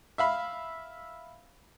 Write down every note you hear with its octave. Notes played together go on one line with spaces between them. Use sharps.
E5 F5 B5